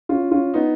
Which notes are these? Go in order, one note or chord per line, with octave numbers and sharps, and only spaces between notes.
C#4 F4
C#4 F4
B3 D#4